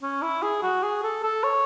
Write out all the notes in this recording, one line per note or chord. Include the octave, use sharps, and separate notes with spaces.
C#4
E4
G#4
F#4
G#4
A4
A4
C#5